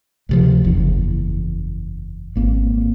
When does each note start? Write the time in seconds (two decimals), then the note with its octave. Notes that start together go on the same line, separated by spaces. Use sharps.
0.29 D2 C3 F3
0.64 F#1 E2
2.35 G#1 A#3 C4